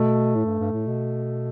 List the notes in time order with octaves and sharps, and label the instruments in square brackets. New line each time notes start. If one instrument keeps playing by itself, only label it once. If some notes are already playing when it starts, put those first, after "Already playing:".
Already playing: [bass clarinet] B2 [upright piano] A3
[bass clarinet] A2
G2
G2
A2
B2